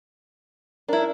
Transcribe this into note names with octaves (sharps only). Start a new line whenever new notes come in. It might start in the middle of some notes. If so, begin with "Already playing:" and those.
D4 E4 A#4